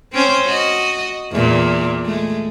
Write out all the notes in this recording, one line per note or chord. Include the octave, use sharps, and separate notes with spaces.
C4 C#4 C5
F#4 D#5
E2 A#2
G#3 A3